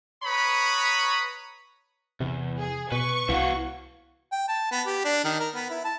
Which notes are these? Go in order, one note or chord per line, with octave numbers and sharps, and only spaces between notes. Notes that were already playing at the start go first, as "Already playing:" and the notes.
B4 C#5 A#5 B5 C#6 D#6
E2 C3
G#4
B2 B4 C#6
C2 E3 B3 F#4 E5 F5
G5
A5
B3
G4
D4
D#3
A#4
B3
E4
A5